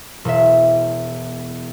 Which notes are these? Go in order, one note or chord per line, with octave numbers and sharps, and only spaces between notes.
E1 E5